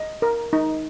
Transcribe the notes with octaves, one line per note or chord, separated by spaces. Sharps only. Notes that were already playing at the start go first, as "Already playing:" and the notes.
Already playing: D#5
A#4
D#4